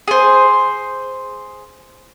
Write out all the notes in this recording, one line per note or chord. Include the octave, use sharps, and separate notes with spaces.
G#4 C5